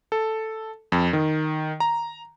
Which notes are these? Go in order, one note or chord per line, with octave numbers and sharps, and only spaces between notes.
A4
F2
D#3
A#5